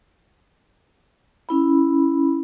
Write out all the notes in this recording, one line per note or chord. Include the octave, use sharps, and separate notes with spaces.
C#4 E4 B5